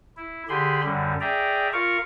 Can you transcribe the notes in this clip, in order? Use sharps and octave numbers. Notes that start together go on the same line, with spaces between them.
E4
D3 G4 G#4 B5 C6
F#2 D3 G3
G#4 D5 E5 G5 A#5
F4 A#4 F5 C#6